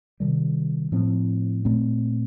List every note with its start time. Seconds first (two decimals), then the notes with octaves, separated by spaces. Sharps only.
0.20 C3 D#3 G3
0.92 A2 F3 C4
1.65 A#2 A3 C4